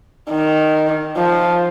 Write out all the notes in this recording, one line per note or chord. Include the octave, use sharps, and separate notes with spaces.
D#3
F3